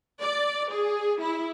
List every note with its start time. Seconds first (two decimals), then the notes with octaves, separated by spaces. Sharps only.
0.21 D5
0.73 G#4
1.21 E4